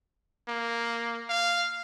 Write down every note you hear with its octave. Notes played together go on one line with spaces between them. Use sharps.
A#3
F5